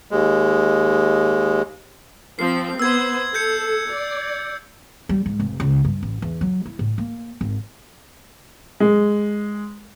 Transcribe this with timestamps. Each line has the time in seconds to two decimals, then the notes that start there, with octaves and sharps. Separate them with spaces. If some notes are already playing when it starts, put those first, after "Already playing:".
0.11 D#2 G#3
2.39 F3 C4 C7
2.79 B3 B4 C5 E6 G#6
3.34 A4 G6 G#6 C#7
3.90 D5
5.09 G3
5.26 G#2
5.40 F1
5.60 C#2
5.85 G2
6.03 A1
6.22 E2
6.41 F#3
6.66 E4
6.79 A2
6.98 A#3
7.41 G#1
8.80 G#3